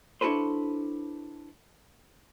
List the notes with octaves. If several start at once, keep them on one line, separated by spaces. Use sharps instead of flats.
D4 E4 F#4 A4 B4 C5